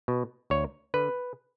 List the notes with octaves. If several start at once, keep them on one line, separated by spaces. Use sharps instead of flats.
B2
D2 C#5
D3 B4